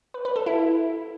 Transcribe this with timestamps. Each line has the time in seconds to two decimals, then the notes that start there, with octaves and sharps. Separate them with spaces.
0.14 B4
0.25 B4
0.36 A4
0.46 E4